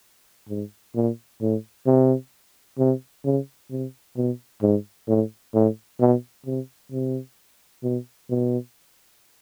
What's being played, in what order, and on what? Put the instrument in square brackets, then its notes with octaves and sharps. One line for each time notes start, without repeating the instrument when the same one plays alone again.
[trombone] G#2
A#2
A2
C3
C3
C#3
C3
B2
G#2
A2
A2
B2
C3
C3
B2
B2